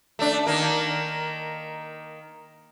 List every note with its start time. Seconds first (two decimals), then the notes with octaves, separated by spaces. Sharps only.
0.19 A3 D4
0.47 D#3 A#3